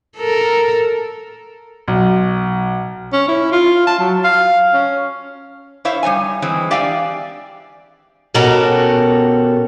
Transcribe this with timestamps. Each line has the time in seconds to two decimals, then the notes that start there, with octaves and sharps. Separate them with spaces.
0.18 A4 A#4
1.88 B1
3.13 C#4
3.28 E4
3.52 F4
3.87 A5
3.99 F#3
4.25 F5
4.74 C#4
5.85 E4 C5 C#5 E5 F5
6.03 G3 D#4 C#5 G#5
6.42 E3 G#3 C4
6.71 G4 D5 E5 F5 G5 G#5
8.34 B2 C#4 F#4 G4 A4 A#4